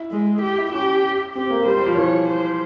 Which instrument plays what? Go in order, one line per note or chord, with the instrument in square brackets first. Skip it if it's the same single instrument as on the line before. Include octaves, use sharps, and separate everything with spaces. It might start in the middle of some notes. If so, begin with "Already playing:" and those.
Already playing: [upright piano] E4
[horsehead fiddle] G#3
G4
[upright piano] E4
[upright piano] C#4 [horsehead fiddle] G4
[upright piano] C4 [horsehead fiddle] G4
[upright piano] A#3
[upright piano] G3 [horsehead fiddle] C5
[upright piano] G3
F3
[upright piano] E3 [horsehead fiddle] C#5
[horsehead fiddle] C5